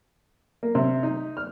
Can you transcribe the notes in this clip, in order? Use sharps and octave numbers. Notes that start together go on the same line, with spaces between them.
A#3
C3
D#4
F6